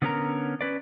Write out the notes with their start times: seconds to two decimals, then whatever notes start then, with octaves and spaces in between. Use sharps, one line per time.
0.02 D3 B3 C#4 G4 A#4 A#5
0.61 C#4 B4 D5